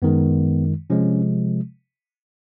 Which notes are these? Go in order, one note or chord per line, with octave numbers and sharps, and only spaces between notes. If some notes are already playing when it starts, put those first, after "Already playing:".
F#2 D#3 G#3 B3
C3 F3 G#3 C#4